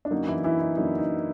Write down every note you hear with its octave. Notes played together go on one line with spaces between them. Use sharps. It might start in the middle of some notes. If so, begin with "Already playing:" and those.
D4
F#2 D3 F#3 A#3 D#4
E3 E4
E3 E4
D#4
F#2 D3 F#3 A#3 D#4
D#4